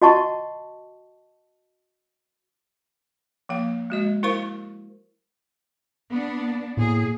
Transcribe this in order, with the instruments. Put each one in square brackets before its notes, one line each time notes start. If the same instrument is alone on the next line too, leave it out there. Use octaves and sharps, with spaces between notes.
[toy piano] F#4 D#5 F#5 A5 C#6
[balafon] F3 A#3 F5
G#3 F#4 D#5
E4 A#4 C5 F5 C#6
[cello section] B3 D4
[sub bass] A2 [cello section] A#3 G#4